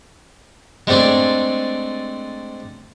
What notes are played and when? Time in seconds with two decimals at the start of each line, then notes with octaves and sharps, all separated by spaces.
0.87 G#3 A3 C4 D4 G#4